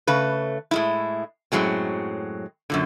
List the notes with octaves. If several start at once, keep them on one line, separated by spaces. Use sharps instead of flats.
C#3 A3 B4
A2 G#3 E4
F#2 A2 F#3 G#3 C4
F#2 A#2 D3